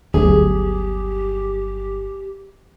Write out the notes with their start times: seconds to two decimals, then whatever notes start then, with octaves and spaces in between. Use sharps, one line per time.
0.14 G1 D2 F#3 G4 G#4